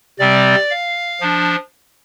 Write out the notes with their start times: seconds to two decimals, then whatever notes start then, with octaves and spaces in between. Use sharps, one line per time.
0.19 C3 G3 C4 D5
0.71 F5
1.21 F3 D4